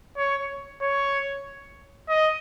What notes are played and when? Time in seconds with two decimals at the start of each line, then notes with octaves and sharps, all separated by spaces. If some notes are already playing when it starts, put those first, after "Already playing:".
0.17 C#5
0.82 C#5
2.09 D#5